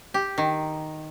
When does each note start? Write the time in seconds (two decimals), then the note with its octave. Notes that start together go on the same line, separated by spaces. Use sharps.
0.14 G4
0.38 D#3